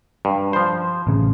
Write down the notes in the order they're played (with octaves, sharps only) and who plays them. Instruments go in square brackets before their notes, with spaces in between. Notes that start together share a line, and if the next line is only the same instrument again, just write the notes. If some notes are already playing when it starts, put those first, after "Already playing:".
[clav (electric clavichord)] G2
F3 C5
[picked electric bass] A1 C#3